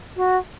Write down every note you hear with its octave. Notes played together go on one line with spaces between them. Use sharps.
F#4